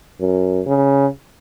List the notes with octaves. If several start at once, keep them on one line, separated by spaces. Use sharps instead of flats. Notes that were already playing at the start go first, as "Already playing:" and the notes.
F#2
C#3